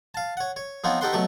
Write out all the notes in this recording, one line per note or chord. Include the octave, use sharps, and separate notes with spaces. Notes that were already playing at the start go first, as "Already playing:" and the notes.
F5 A5
C#5 F#5
C#5
F3 B3 C4 D#4 F4 C#5
D#4 G4 A4 B4 F#5 C6
B2 F#3 A3 B4 C#6